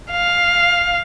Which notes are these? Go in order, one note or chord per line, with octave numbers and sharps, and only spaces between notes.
F5